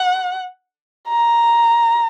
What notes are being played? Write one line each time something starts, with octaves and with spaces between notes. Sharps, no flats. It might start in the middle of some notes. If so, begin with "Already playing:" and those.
Already playing: F#5
A#5